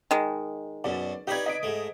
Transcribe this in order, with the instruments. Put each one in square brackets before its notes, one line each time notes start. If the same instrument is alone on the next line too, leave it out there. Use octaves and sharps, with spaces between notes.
[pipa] D#3 G#3
[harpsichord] F#2 B2 [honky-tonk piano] D5
[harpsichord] D#4 B4 D5 [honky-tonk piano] G4 G#6
[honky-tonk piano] D#5 B6 D7
[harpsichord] G#2 A3